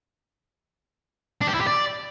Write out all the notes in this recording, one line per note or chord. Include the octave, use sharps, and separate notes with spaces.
D4
G4
E4
G4
D5